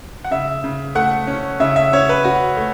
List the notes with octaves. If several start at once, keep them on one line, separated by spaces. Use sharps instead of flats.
F#5
C#3 E5
C#3
A3 F#5
C#4
C#3 E5
E5
C#4 C#5
B4
C#4 F#4
A3